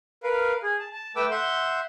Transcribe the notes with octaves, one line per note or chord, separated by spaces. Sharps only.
A#4 B4 F5
G#4
A5
A5
A3 B4 G5 D6 E6
E5 F#5 C6 G6